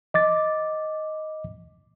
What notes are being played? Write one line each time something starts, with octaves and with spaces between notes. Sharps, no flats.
D#5 D6 A6